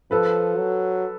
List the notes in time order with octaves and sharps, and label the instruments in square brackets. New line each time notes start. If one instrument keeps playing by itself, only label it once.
[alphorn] F3 [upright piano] A4 B4
[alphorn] F#3